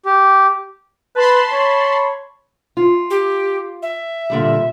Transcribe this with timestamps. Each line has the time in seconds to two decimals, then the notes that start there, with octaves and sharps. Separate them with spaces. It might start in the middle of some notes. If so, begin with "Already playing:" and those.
0.06 G4
1.16 B4 A5 B5 C6
1.52 C#5
2.77 F4
3.10 G4
3.82 E5
4.30 A#2 D3 G3